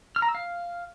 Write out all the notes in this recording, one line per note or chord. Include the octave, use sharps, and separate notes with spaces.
F6
A#5
E6
F5